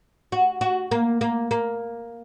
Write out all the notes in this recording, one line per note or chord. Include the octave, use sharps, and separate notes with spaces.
F#4
F#4
A#3
A#3
A#3